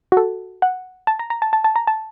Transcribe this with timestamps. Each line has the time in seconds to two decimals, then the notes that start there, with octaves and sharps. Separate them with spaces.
0.12 F#4
0.17 A4
0.62 F#5
1.07 A5
1.19 A#5
1.30 A#5
1.42 A5
1.53 A5
1.64 A5
1.76 A#5
1.87 A5